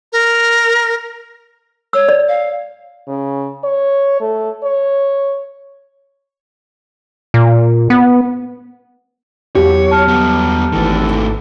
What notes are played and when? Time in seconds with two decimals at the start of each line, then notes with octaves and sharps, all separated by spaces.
0.13 A#4
1.93 C#5 E6
2.09 D5
2.27 F5
3.08 C#3
3.64 C#5
4.20 A3
4.64 C#5
7.34 A#2
7.90 B3
9.55 E2 F#3 G4 C#5
9.91 A5 F6
10.08 G3 B3
10.72 G#1 D#3 E3 A3 A4